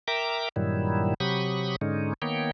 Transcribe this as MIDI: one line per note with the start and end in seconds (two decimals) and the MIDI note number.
0.08 0.49 70
0.08 0.49 76
0.08 0.49 79
0.08 0.49 82
0.08 0.49 86
0.56 1.14 43
0.56 1.14 46
0.56 1.14 51
0.56 1.14 54
0.56 1.14 55
0.56 1.14 64
1.20 1.76 48
1.20 1.76 54
1.20 1.76 67
1.20 1.76 83
1.20 1.76 85
1.20 1.76 87
1.81 2.14 44
1.81 2.14 50
1.81 2.14 56
1.81 2.14 61
1.81 2.14 63
2.22 2.51 51
2.22 2.51 58
2.22 2.51 59
2.22 2.51 73
2.22 2.51 79